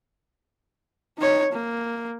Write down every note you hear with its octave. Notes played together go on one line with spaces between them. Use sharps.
D#4 C#5
A#3